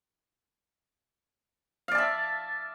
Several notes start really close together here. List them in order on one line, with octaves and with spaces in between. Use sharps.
F5 D5 A5 E5